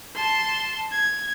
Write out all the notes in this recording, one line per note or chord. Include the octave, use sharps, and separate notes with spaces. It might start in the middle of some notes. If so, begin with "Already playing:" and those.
A5 C6
G#6